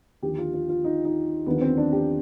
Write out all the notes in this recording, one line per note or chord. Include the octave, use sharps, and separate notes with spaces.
D#2 D3 F3 G4
F4
F4
F4
D#4
D#4
D#2 D3 F3 B3
C4
D4
G4